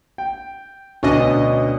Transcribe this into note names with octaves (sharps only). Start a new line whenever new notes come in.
G5
D2 B2 C#4 D4 D#5